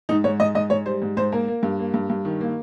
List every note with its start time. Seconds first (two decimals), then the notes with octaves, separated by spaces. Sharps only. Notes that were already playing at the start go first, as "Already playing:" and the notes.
0.09 G#2 D#4
0.24 G#2 C#5
0.40 G#2 D#5
0.55 G#2 D#5
0.70 G#2 C#5
0.86 G3 C5
1.02 G#2
1.17 G#2 C5
1.32 A#3 A#4
1.48 A#3
1.63 G2
1.79 A#3
1.94 G2
2.10 G2
2.25 D#3
2.41 A#3